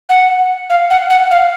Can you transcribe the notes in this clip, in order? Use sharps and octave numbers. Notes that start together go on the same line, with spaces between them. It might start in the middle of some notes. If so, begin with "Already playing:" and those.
F#5
F5
F#5
F#5
F5